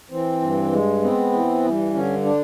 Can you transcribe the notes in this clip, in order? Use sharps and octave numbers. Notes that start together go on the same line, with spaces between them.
E3 C4
G2
G#3
B3 C4
E3
G2
D3 C#4
D4